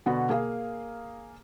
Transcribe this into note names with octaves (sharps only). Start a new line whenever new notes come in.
B2 D3 B3 F#4
A#3 G#4 F5